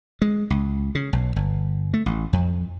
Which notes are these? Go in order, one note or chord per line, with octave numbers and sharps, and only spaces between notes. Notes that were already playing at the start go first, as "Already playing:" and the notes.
G#3
C#2
C#3
B1
G1
A3
A1
F2